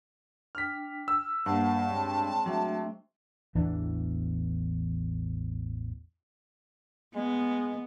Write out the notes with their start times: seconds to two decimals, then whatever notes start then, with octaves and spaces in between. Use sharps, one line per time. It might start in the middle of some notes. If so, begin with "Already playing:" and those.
0.55 D4 G5 F6 B6
1.08 E6
1.46 G2 A#3 C5 F5 F#5 A5
1.89 G#3 C4 C#5 G5
2.46 F#3 A3 D4 E5
3.55 A1 E2 E3 D4
7.15 G#3 B3